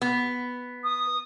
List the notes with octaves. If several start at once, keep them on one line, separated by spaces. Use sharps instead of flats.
B3
D#6